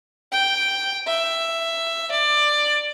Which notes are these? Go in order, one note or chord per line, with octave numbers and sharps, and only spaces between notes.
G5
E5
D5